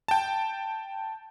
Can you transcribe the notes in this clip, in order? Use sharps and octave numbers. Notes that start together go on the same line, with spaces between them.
G5 A5